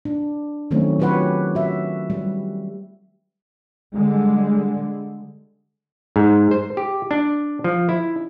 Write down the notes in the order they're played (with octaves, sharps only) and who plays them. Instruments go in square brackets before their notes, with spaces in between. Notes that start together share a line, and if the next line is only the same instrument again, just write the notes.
[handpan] D4
D#3 F#3 A3 C4 C#4
F#3 F4 G4 B4 C#5 F#5
F#4 E5
G3
[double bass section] D3 G3 G#3
[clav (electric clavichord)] G#2
C5
G4
D4
F3
E4